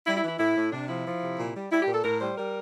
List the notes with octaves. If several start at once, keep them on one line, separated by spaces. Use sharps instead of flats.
G3 E4
E4
E3
E4
A2 E4
A2
C3 D4
F3 E4
F3
C3
A#2
G3
G3 E4
G4
A#2
A4
A2 A#4
G3 C5
G3 A#4